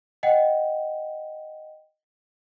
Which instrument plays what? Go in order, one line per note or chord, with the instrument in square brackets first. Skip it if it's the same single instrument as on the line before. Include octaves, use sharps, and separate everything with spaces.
[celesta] D#5 F#5 G5